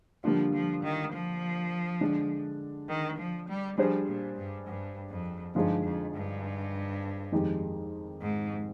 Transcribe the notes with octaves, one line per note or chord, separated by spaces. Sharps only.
D3 F3 G3 A#3 D4 F4
F3
D#3
F3
D3 G#3 D4
D#3
F3
G3
F3 G3 D4 G#4 C5
A#2
G2
G2
F2
G2 D3 F3 G#3 D#4 G#4
F2
G2
F2 D#3 G#3 D#4 G4
G#2